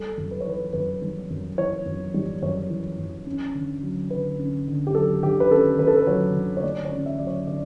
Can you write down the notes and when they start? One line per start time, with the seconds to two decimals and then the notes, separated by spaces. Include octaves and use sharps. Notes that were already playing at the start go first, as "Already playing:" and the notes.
Already playing: G3 A4
0.17 F#2
0.31 B4
0.41 C#5
0.46 E3 B4
0.73 F#2 B4
1.02 G3
1.30 F#2
1.58 E3 C#5
1.85 F#2
2.14 G3
2.42 F#2 C#5
2.70 E3
2.98 F#2
3.26 C#4
3.54 D3
3.83 F#3
4.10 D3 B4
4.39 C#4
4.67 D3
4.87 G4
4.94 F#3 A4
5.23 D3 G4
5.40 B4
5.51 C#4 A4
5.79 D3 B4
5.87 A4
5.97 B4
6.07 F#3 C#5
6.35 D3
6.57 C#5
6.63 A3 D5
6.85 C#5
6.92 C#4
7.06 E5
7.19 F#3 D5
7.27 C#5
7.47 D3 D5